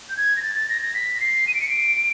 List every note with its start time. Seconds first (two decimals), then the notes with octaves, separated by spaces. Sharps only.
0.09 G6
0.17 G#6
0.37 A#6
0.42 A6
0.55 A6
0.69 A#6
0.82 A#6
0.94 B6
1.20 C7
1.48 D#7
1.55 D7
1.61 C#7
1.69 D7